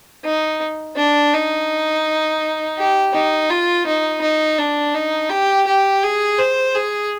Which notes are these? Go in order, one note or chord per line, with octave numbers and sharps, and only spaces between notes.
D#4
D4
D#4
G4
D#4
F4
D#4
D#4
D4
D#4
G4
G4
G#4
C5
G#4